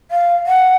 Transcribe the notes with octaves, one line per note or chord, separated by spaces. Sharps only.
F5
F#5